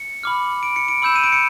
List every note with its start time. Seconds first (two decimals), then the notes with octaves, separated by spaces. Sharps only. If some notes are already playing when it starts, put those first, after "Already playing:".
Already playing: C#7
0.23 B5 D6 F6
0.63 D7
0.76 C#7
0.88 D7
1.02 B5 E6 G6 E7
1.16 D#7
1.24 D7
1.32 C#7